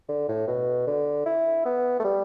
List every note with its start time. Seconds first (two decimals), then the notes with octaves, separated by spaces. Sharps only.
0.08 D3
0.28 A2
0.47 B2
0.87 D3
1.26 E4
1.65 B3
2.00 A3
2.04 G3